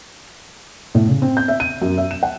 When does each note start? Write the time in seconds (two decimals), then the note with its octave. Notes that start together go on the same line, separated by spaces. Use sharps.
0.95 A2
1.09 C#3
1.22 C4
1.37 G6
1.48 E5
1.60 D#7
1.82 F#2
1.98 E5
2.11 E7
2.23 F#5